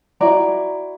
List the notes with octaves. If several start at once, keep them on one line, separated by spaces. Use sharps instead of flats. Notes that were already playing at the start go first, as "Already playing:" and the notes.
E4 F#4 D5 A#5